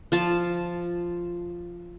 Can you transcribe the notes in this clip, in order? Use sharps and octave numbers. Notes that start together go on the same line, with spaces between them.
F3 A5